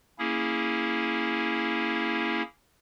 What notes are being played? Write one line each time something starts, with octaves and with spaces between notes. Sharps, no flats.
A#3 C#4 E4 G#4